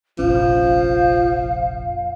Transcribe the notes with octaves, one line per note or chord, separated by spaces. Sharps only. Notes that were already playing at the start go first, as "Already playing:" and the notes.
F1 A#1 F3 C#4 F5